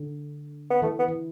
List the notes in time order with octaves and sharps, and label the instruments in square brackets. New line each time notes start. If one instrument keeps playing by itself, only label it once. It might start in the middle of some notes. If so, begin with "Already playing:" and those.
Already playing: [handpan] D3
[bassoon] B3
[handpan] E3 [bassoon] A3
[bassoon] B3
[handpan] E3